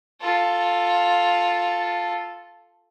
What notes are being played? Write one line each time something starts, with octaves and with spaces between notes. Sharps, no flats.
F4 A4